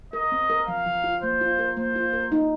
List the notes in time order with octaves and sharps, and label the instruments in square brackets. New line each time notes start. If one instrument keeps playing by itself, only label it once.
[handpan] A#4 [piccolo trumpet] D#5
[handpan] C4
A#4
[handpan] F3 [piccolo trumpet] F5
[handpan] F3
F4
[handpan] A#3 [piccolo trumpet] C5
[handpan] F4
A#4
[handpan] A#3 [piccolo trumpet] C5
[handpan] F4
A#4
D#4